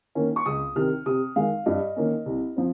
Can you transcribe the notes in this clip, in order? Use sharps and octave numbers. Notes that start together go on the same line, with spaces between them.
D#3 A#3 C#4
C#6
C#2 D#6
C3 D#3 F6
C3 D#6
D#3 G#3 F5
G2 D#5
D#3 A#3 C#4
C2
F3 C4